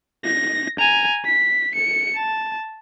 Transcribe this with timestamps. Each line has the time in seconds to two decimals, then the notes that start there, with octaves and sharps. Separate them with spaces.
0.25 A#6
0.79 G#5 A#5
1.26 B6
1.75 C#7
2.15 A5